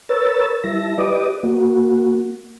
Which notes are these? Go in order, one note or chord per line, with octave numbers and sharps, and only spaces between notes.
A#4 B4 C#5 E6 A6
G3 E4 E5 A5 A#6
G4 B4 D5 D#5 D6 D#6
A#3 F#4